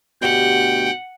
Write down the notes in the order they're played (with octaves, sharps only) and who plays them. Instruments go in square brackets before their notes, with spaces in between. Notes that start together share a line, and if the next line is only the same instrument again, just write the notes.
[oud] D2 G4 [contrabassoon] B2 [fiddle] F#5 [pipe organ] G5